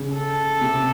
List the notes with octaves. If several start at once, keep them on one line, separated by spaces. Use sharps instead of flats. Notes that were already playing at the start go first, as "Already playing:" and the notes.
Already playing: C#3
A4
C3